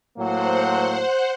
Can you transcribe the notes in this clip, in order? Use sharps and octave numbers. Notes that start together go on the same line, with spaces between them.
A2 F#3 A#3 C5 F#5